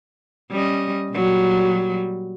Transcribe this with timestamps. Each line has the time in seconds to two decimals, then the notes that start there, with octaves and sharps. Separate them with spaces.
0.51 G3 C#4 D#5
1.12 A#2 F#3 G3